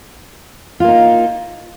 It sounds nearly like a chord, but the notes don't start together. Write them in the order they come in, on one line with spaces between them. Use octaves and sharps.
F4 A#3 D#4